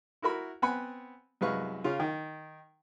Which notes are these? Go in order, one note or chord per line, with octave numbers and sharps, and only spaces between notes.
E4 F#4 A#4 B5
B3 C4 F#5 G#5 B5
C2 F#2 G#3 B4 F5 C#6
C#3 F4
D#3